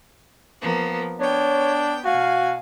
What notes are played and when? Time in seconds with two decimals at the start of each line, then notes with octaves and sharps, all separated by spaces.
0.61 F3 A#3 B3
1.20 B3 D4 C#5 G5
2.05 B2 F#4 F5 G#5